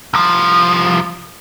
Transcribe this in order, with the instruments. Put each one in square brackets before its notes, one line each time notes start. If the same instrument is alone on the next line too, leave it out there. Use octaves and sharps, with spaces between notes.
[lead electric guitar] C2 F3